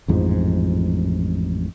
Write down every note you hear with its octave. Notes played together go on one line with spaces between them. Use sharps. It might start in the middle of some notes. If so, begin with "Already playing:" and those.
A1 F2 G#2 F3